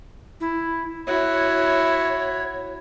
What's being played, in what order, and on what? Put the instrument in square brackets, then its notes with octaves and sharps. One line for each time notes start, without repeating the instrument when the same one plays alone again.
[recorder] E4
[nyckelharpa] E4 F#4 [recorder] C#5